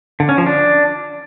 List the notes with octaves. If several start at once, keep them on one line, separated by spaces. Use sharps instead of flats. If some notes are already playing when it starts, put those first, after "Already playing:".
D3
C#4
F3
D4